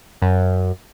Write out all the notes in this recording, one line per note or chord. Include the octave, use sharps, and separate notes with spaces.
F#2